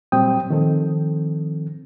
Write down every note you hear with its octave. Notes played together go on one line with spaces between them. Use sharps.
A#2 F#3 G3 C4 G5 D#6
D#3 F3 C4 A4